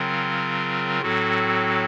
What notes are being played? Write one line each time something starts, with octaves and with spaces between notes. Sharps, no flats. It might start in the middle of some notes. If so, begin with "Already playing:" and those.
Already playing: C#3 F#3 C4 F4 A#4
A2 F#3 C4 F#4 A4